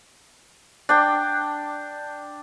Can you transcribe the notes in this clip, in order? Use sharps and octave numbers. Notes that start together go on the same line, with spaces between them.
D4 G5